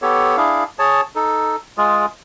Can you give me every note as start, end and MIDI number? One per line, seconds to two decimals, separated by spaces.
0.02 0.36 59
0.02 0.36 67
0.02 0.36 69
0.02 0.36 73
0.37 0.64 62
0.37 0.64 64
0.37 0.64 68
0.37 0.64 77
0.79 1.01 68
0.79 1.01 73
0.79 1.01 81
1.16 1.56 63
1.16 1.56 69
1.78 2.06 56
1.78 2.06 65
1.78 2.06 68